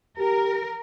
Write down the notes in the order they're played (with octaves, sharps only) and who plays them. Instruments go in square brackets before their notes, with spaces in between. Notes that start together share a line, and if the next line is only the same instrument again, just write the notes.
[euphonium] G4 [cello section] A#4